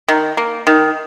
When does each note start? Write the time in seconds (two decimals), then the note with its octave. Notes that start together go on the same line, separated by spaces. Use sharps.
0.08 D#3
0.37 A#3
0.67 D#3